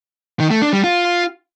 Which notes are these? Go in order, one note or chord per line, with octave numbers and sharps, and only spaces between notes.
D#3
A3
D4
G3
F4